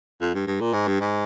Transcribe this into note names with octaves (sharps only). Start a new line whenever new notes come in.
F2
G2
G2
A#2
G#2
G2
G#2